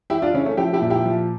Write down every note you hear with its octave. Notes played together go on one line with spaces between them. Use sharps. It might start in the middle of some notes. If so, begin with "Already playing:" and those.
E3 E4 G4
D4 F4
C#3 C#4 E4
A3 C#4
F3 E4 G4
E4 G4
A#2
E4 G4
F3